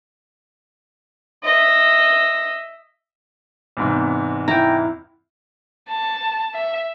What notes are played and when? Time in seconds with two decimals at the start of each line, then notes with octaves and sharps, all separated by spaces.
1.44 D#5 E5
3.77 E2 G#2 C3
4.48 E4 G5 A#5
5.90 A5
6.54 E5